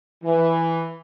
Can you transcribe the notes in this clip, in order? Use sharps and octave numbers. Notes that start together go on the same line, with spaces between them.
E3